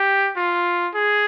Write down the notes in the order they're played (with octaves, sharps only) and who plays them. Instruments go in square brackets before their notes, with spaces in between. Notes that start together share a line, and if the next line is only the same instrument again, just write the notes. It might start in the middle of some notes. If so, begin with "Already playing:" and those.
Already playing: [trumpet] G4
F4
G#4